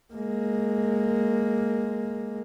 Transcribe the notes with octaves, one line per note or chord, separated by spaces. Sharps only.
G#3 A#3